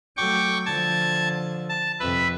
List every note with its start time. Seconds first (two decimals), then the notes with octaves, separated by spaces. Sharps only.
0.17 F#3 A3 G5 C#6 D6
0.66 D3 F3 A5 G#6
1.69 A5
2.00 F2 C3 B4 E5